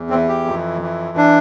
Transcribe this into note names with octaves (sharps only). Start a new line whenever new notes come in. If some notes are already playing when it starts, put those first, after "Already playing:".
Already playing: E2
E3 C4
G4
F2
E3
D4